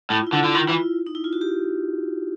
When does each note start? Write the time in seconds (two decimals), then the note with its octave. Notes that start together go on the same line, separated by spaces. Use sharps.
0.10 A2 E4
0.20 F4
0.27 E4
0.33 D3
0.36 F4
0.43 D3 E4
0.52 D#3 F4
0.60 E4
0.68 E3 F4
0.76 E4
1.07 D#4
1.15 E4
1.24 F4
1.33 F#4
1.41 G4